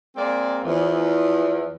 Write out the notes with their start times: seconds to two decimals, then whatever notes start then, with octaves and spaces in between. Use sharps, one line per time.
0.16 G#3 A#3 C4 D5
0.64 E2 F3